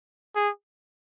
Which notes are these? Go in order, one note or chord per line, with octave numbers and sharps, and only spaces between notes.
G#4